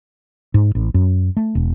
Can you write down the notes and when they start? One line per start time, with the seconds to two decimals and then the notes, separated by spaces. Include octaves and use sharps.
0.54 G#2
0.75 A1
0.94 F#2
1.37 A3
1.55 E1